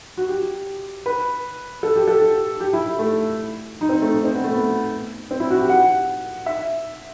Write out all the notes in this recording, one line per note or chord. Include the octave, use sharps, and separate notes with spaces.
F#4
G4
B4
A4
G4
A4
G4
E4
A3
D#4
C4
A3
D#4
C4
B3
A3
B3
C4
E4
F#4
G4
F#5
E5